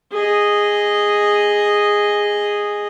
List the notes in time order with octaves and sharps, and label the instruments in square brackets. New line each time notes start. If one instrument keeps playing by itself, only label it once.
[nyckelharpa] G#4 D#5